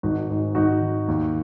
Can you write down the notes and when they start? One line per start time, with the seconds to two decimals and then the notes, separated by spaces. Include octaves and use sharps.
0.03 G#1 D#4 F#4
0.30 G#2
0.55 G#1 D#4 F#4
0.81 D#3
1.08 D#2